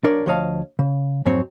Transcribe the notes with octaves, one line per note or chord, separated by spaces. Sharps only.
B1 D4 A#4 C#5 D5
D2 F3 C#5 D#5 F5 A5
C#3
F2 G#2 F#3 C4 C#5